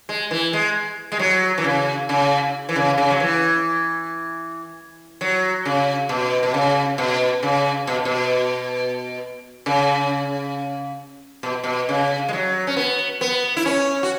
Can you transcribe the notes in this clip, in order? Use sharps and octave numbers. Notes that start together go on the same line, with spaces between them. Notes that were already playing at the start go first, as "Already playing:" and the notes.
G#3
E3
G#3
G#3
F#3
E3
C#3
C#3
E3
C#3
C#3
F#3
E3
F#3
C#3
B2
B2
C#3
B2
C#3
B2
B2
C#3
B2
B2
C#3
G#3
F#3
C#4
B3
B3
E4
C#4
F#4